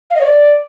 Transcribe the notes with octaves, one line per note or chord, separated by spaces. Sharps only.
F5
D#5
C#5
D5